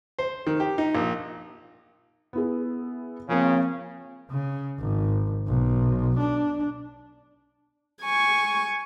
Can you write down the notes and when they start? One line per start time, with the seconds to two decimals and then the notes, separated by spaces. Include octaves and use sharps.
0.19 C5
0.47 D#3
0.60 G4
0.78 D#4
0.95 A#1
2.33 B3 E4 G#4
3.28 C#3 F3 A#3 C4
4.31 C#3
4.80 G#1
5.47 B1
6.19 D4
8.03 G#5 C#6